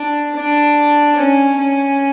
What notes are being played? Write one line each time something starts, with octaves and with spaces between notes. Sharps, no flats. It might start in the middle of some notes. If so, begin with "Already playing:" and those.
Already playing: D4
D4
C#4
C#4